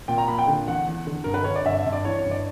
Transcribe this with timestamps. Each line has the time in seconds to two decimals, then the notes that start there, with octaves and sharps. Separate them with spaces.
0.08 A#2 G5
0.18 A#5
0.28 A#2 B5
0.38 G5
0.47 D3
0.68 E2 F#5
0.87 E2
1.07 D3
1.24 G2 A#4
1.34 B4
1.44 D3 C#5
1.56 D5
1.65 G2 E5
1.78 E5
1.86 G2
1.93 D5
2.05 E3 C#5
2.19 C#5
2.25 G2
2.31 D5